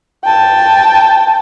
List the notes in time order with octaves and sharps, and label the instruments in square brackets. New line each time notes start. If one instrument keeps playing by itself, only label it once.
[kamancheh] G5 A5